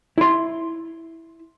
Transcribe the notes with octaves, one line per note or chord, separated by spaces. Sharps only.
E4 C6